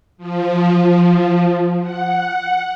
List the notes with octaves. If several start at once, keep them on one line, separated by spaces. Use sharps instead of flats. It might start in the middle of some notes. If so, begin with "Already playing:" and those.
F3
F#5